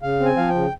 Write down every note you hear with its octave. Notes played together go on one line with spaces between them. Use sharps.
C#3 F5
C4
G#5
F3 F5
G5
C#3